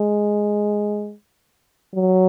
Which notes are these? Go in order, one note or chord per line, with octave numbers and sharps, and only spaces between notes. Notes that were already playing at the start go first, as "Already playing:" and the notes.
Already playing: G#3
F#3